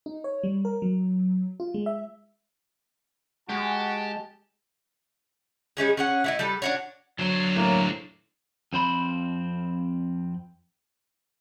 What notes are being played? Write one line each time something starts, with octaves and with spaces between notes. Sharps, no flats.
D#4
C#5
G3
A#4
F#3
F4
G#3
E5
G#3 F#4 G4 A5
G3 G#3 C#4 G#4
C#4 G#4 F#5
A3 E4 D#5
G3 A4 B4
D4 F#4 C#5
D3 F#3 C5
A2 A#3
F2 C4 C5 B5